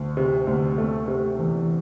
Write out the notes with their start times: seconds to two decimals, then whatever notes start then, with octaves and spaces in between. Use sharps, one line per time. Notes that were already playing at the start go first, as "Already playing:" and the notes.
Already playing: D2
0.17 C3
0.47 D2
0.78 A3
1.08 C3
1.39 E2